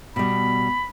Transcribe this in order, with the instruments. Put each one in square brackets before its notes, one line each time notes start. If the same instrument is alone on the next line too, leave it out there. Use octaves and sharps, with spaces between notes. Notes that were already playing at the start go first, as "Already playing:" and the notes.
[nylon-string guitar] B2 G3 [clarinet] B5